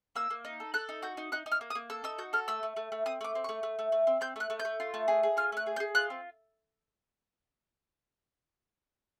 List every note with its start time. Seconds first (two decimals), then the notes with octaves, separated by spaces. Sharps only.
0.16 A#3 E6
0.30 A#3
0.45 D#4
0.60 A4
0.74 A4 F#6
0.89 D#4
1.02 F#4 G6
1.17 D#4
1.32 D#4 F#6
1.46 D#4
1.52 F6
1.61 A#3
1.70 D#6
1.75 A#3
1.90 A4 E6
2.04 D#4 E6
2.18 F#4 G6
2.33 A4 F6
2.48 A3 E6
2.63 A3
2.76 A3
2.92 A3
3.06 C4 D#6
3.21 A3 D6
3.35 C4
3.44 A3 C#6
3.63 A3
3.79 A3
3.92 A3
4.07 C4
4.21 C4 G6
4.36 A3 F#6
4.50 A3
4.59 G6
4.65 A3
4.80 F4
4.94 A3
5.08 G#4
5.23 G#4
5.37 F4 F6
5.52 A3 F#6
5.66 G#4
5.76 G6
5.80 G#4
5.95 F4 F#6
6.10 C4